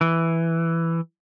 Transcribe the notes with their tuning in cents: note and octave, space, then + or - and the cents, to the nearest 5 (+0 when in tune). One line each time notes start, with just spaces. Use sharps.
E3 +5